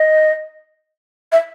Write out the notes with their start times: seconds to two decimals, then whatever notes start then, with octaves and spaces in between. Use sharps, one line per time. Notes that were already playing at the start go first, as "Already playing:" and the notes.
Already playing: D#5
1.32 E5